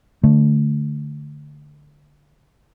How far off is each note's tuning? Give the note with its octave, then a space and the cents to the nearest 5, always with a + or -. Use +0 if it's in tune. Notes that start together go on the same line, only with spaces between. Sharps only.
D3 +0 A3 -5